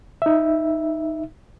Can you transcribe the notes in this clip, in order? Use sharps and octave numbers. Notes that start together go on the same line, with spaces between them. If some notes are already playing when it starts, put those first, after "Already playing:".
D#4 E5